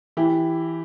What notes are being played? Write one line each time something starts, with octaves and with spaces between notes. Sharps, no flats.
E3 E4 G4